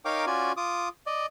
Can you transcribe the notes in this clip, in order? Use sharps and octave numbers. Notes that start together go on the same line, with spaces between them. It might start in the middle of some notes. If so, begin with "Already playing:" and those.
D#4 A#4 C#5 F5 G5 D6
C#4 F4 F#4 D5 G#5
F4 D6 D#6
D5 D#5